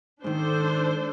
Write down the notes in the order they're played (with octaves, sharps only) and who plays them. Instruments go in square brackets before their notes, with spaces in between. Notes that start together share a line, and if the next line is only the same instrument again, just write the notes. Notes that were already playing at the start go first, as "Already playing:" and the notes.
[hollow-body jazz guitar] G#2 D#3 [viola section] D4 A4 C5